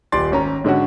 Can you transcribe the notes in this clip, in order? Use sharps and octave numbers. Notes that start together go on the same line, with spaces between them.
D#1 G4 D5 C6 A6
G#1 C#4 A#5
G#2 D3 C#4 F#4